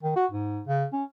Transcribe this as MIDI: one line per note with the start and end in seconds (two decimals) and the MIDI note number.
0.03 0.16 51
0.16 0.26 66
0.31 0.61 44
0.67 0.85 49
0.93 1.04 61